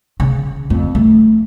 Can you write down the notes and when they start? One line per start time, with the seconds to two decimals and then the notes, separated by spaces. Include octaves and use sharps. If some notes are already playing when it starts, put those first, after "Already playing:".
0.20 C#3
0.70 F2
0.95 A3